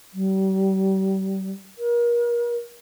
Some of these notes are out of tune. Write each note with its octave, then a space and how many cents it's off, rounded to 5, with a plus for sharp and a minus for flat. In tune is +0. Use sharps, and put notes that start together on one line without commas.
G3 -35
A#4 +35